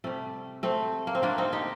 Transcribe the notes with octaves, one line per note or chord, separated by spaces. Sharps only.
C3 G3 A3
A3 C4
A#3
C4
D3 A3 A#3 D4
C4 D#4
D#4 G4